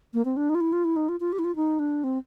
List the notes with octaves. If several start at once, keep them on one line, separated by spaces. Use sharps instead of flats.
A#3
C4
D4
D#4
F4
E4
F4
E4
D#4
F4
F4
G4
E4
F4
D#4
D4
C4